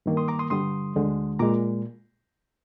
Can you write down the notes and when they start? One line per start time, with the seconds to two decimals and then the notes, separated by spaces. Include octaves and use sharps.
0.06 G2 D#3 A#3
0.17 C6 D#6
0.28 A#5 D6
0.39 C6 D#6
0.50 G2 D3 G3 C6 D#6
0.95 D2 D3 G#3
1.39 A#2 G#3 A#5 D6